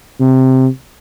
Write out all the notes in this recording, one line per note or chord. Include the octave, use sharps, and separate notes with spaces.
C3